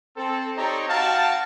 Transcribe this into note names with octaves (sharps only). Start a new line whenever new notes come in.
C4 A4
C4 D#4 G4 C#5 D5 A#5
F#4 F5 G5 A5